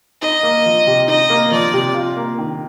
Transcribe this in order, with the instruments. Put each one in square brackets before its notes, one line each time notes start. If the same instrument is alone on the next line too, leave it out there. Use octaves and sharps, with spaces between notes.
[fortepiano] D#4 [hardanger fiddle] D#5
[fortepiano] A#3
F3
C3
[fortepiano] D#4 [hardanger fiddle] D#5
[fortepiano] A#3
[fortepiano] F3 [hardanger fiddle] D5
[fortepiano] C3
F4
A#3
D#3